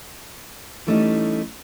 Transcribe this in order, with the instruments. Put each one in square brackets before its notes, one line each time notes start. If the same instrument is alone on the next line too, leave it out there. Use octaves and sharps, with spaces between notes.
[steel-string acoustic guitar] E3 G3 A3 C#4 D#4 E4